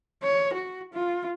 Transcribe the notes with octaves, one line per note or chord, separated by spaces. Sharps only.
C#5
F#4
F4